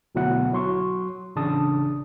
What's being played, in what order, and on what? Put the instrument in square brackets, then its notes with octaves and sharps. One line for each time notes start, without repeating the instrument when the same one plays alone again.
[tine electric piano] D2 B2 F#3 E4 F#5
F#3 C6 C#6
A1 C#3 D4 A5 D#6